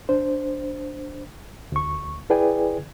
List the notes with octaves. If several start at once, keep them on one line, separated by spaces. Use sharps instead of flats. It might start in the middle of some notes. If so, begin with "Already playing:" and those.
D4 C5
D2 C#6
E4 G#4 B4 D5 G5 G#5